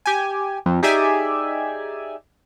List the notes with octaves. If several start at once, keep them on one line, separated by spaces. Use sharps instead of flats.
G4 G#5
F2
D#4 G4 G#4 D5 E5 G#5